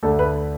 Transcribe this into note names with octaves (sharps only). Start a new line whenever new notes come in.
D2 D3 A3 A4
B4